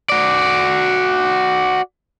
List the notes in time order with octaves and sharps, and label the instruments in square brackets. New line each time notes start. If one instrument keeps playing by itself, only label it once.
[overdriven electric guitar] F#4 D5